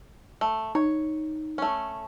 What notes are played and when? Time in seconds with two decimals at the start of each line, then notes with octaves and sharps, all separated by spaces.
0.41 A3
0.75 D#4 C#5
1.58 A3 C#4